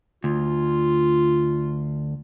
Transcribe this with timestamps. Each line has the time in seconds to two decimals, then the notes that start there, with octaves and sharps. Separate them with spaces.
0.24 D2 F4